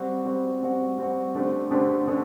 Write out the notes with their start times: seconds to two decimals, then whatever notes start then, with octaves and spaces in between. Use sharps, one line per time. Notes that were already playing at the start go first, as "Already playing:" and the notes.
Already playing: G3 C4 F#4
0.25 G3 C4 F#4
0.62 G3 C4 F#4
0.98 G3 C4 F#4
1.35 D3 A3 D4 G4 C5
1.71 D3 A3 D4 G4 C5
2.07 D3 A3 D4